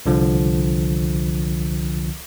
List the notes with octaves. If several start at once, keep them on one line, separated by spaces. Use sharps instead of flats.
C2 D3 F3